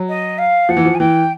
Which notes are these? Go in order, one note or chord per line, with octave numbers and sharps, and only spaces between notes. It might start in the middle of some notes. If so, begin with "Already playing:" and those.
Already playing: F#3
D#5
F5
F3 F#5
E3
F3
G#5
E3 G5